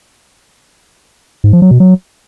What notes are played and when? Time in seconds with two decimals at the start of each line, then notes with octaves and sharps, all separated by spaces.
1.44 G#2
1.53 F3
1.62 F#3
1.71 B2
1.80 F#3